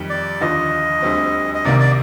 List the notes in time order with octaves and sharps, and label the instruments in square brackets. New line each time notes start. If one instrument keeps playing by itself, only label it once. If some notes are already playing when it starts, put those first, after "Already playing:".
Already playing: [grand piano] F2 D#3 G3
[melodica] D5
[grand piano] D#2 D3 F3 [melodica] D#5
[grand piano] D2 D3 G3 C4
[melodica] D#5
[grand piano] C2 C3 D#3 A#3 [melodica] D5
[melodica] D5